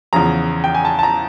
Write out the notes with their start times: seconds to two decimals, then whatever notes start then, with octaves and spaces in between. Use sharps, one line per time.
0.13 E2 C#3 F3 A#5
0.64 G5
0.74 G#5
0.85 A5
0.99 A5
1.03 A#5